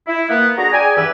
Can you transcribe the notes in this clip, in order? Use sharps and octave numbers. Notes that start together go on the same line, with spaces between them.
E4
A#3 B3
D4 F#4 G#4 A#5
G#4 D5 G5 G#5
E2 G2 E3 G4 B4 E5